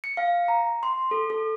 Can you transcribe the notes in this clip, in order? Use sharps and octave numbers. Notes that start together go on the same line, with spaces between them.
C#7
F5
A#5
C6
A4
A4